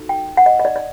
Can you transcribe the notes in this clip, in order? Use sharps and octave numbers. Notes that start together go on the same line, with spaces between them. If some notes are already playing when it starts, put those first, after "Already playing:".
Already playing: D#4 F#4 A4
G5
F#5
D#5
D#5
D5
D5